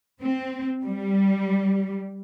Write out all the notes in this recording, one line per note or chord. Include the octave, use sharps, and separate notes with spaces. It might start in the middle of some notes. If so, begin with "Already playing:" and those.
C4
G3